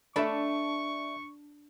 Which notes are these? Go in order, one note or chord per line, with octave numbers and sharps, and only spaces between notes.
A3 D4 D5 E5 A5 B5 C#6